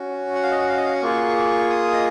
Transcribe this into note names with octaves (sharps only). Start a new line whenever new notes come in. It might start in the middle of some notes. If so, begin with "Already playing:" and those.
Already playing: C#4 F#4
F#5
F5
D#5
F#5
F5
D#5
F5
F#5
A#3 F4 G#4 C#6
D#6
D#5